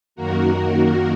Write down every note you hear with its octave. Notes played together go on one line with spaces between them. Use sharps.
F#2 D#3 A#3 F#4 A#4